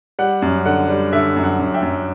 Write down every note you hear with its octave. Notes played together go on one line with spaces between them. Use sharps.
G3 F#5
F#2
D3 F#5
G3
D3 E5
F#2
F#5
F#2
E5 G5
F#2